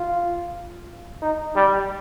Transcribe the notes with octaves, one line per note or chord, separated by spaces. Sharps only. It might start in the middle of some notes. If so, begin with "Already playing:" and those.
Already playing: F4
D#4
G3